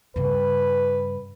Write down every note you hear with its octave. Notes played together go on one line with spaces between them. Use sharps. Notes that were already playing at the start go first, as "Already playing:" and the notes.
G2 C#3 B4